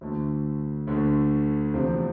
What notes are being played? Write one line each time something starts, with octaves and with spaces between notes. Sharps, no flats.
D2 D3 A3
D2 D3 A3
E2 C3 F3 A3 C4